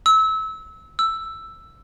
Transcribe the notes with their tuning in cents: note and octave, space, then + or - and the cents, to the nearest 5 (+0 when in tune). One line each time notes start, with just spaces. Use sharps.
E6 -25
E6 +5